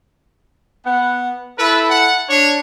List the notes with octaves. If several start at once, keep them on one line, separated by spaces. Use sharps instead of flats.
B3 F#5
E4 A4 B4
F#5
D4 C#5